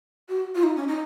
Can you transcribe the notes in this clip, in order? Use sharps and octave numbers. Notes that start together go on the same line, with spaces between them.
F#4
F4
D#4
C#4
D#4